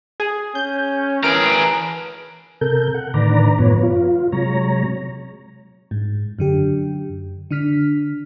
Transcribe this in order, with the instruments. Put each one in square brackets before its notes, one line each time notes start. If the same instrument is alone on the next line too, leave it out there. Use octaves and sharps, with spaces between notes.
[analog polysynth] G#4
[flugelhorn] C#4 [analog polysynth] G6
[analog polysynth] E3 D7 [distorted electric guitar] G#4 A#4 [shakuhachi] B4
[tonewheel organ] C3 A4 A#4 G6
F#5
A2 D3 D#3 B4 D5 A#5
F#2 A2 F3 B3 B4 C#5
F4
C3 F#3 G#3 C#5 A#5
[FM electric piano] G#2
F#2 D3 G4
D3 D4 F6 B6